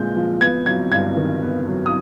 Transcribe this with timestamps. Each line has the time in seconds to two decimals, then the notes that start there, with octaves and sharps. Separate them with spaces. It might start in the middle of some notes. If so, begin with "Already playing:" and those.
Already playing: A#2 G#3 G6
0.16 F3
0.41 B3 G#6
0.66 F#3 G#6
0.92 G2 G#6
1.17 D#3
1.42 B3
1.68 F#3
1.86 D#6